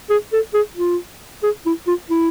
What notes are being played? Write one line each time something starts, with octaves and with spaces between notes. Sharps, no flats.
G#4
A4
G#4
F4
G#4
E4
F4
E4